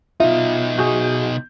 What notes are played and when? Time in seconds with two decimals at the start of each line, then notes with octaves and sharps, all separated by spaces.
0.20 B2 D#4 F4 E5
0.78 F#4 G#4 G6